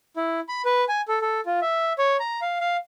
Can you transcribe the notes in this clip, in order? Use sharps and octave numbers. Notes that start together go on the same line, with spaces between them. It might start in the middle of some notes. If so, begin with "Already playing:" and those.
E4
B5
B4
G#5
A4
A4
F4
E5
C#5
A#5
F5
F5